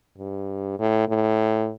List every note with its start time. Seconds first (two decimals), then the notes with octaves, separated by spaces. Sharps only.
0.18 G2
0.79 A2
1.09 A2